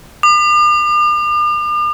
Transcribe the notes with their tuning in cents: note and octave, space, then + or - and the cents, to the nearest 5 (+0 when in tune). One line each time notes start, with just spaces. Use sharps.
D6 +45